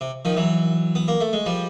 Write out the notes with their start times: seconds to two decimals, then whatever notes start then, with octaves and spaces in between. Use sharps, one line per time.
0.01 C3
0.25 D#3 F3
0.37 E3 F#3
0.95 B3
1.08 A#3
1.21 A3
1.33 G#3
1.46 F3 G3